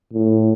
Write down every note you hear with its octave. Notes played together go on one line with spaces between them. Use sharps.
A2